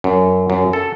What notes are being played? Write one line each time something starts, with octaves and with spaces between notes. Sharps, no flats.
F#2
F#2
A4